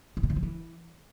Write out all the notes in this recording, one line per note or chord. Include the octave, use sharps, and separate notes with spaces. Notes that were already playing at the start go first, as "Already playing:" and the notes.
A2
B2
D3
F3
E3